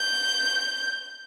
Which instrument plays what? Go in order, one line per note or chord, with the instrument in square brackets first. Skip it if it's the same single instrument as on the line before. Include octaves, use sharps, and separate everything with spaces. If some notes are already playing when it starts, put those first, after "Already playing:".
Already playing: [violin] G6